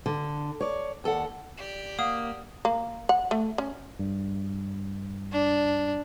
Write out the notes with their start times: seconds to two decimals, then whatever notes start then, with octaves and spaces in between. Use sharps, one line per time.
0.06 D3
0.61 C#5 D5
1.04 D#2 A4 D5 F#5
1.58 G4 D5
1.99 A#3 F5 F#5 D#6
2.65 A#3
3.09 F#5
3.31 A3
3.58 C#4
3.99 G2
5.32 D4